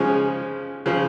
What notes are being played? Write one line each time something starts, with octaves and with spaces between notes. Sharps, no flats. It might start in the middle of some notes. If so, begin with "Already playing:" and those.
Already playing: C#3 F3 G#3 C#4
C#3 F3